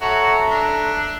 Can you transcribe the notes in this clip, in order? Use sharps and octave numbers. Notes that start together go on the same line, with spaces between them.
F#4 A4 C#5 E5 A#5
D4